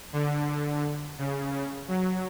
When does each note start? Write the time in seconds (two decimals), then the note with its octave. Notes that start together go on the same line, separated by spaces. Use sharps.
0.13 D3
0.48 D3
1.18 C#3
1.52 C#3
1.88 F#3